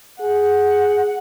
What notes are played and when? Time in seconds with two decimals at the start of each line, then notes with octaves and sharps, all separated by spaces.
0.21 G#4 F#5